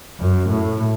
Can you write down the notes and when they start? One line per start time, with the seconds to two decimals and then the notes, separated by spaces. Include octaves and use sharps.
0.20 F#2
0.50 A2